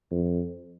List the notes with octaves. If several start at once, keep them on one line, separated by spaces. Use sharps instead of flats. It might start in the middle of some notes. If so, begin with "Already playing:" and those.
F2